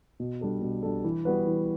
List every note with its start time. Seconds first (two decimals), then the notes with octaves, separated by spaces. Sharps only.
0.20 B2
0.41 G3 D4 A4
0.62 B2
0.83 G3 D4 A4
1.04 E3
1.25 G3 B3 F#4 B4
1.47 E3